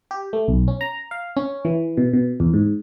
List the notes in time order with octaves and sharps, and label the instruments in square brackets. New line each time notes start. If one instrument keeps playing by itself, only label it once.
[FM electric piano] G4
A3
B1
C#4
A#5
F5
C#4
E3
B2
B2
E2
G#2